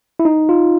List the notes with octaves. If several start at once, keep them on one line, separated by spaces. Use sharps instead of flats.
E4
D#4
F4